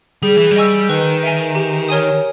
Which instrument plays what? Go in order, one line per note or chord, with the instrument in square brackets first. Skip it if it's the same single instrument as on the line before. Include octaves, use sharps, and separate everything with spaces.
[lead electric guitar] G3 [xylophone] G#4
[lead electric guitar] E3
G3
[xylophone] D#5 G#5 C#6 E6
[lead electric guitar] D#3 [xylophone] B4
[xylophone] E5 G#5
G4
A#4 C#5 G#5 D#6